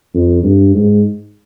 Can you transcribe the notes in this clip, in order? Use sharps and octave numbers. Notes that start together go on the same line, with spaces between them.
F2
G2
G#2